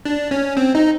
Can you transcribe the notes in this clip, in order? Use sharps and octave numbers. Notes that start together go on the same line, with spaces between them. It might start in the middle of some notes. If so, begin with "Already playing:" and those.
D4
C#4
C4
D#4